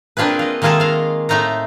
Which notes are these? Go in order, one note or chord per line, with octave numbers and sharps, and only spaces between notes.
A#3 C4 D4 F4 G#4 B4
F4 D#5
D#3 G#3 A#3 F4 G#4 A4
G#3 F5
A2 A3 D#4 F4 A#5